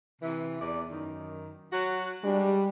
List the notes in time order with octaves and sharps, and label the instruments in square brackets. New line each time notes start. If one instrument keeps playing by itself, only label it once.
[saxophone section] C3 E3
E2 D5
F#2 D#3
F#3 F#4
[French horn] G3 [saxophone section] G#3 D4